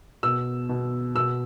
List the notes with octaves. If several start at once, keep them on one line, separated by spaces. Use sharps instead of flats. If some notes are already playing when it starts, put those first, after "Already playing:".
B2 E6
B2
B2 E6